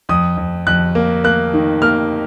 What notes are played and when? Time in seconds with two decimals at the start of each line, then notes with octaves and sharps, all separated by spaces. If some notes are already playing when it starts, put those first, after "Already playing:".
0.09 F2 D#6
0.37 F2
0.67 F2 F#6
0.95 A#3
1.24 A#3 F#6
1.54 D#3
1.82 A#3 F6